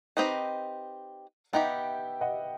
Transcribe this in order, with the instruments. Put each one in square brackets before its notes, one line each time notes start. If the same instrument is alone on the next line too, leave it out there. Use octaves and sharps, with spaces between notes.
[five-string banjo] C4 D#4 G4 B4 D#5
[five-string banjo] B3 D#4 G4 [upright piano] E5 G5
[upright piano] D#5 F#5